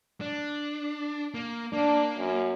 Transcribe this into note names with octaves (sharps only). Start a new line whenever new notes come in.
D4
A#3
A#3 D4
F#2